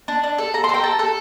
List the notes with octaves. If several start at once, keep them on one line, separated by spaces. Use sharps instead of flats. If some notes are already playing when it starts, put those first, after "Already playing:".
D4
D4
A4
A4 A#5
C6
A4
G5 A#5
A4
A4